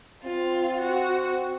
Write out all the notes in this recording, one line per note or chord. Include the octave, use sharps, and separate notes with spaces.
C4 F4
F#4